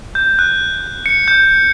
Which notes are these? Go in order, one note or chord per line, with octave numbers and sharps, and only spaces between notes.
G6
F#6
C#7
G6